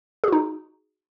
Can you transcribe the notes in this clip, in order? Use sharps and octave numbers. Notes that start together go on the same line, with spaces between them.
D#4 F#4 G#4